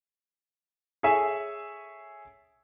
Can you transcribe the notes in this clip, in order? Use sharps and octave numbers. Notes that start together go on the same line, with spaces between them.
G#4 A4 C#5 E5 G#5